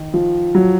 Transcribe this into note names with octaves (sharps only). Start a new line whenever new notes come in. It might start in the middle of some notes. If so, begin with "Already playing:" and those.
Already playing: D#3
F3
F#3